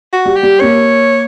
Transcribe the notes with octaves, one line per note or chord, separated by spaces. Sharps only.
F#4
G3
G4
G3
A#3 C#5